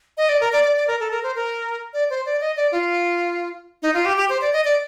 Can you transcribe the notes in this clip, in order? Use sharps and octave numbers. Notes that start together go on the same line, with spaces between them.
D#5
D5
A#4
D5
D5
D5
A#4
A4
A#4
C5
A#4
D5
C5
D5
D#5
D5
F4
D#4
F4
G4
G4
C5
D5
D#5
D5